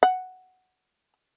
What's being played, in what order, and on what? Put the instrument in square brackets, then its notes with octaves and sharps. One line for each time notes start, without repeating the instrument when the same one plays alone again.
[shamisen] F#5